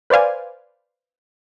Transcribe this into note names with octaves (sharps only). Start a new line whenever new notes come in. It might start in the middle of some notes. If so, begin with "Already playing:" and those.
B4 C5 D5 F5 G#5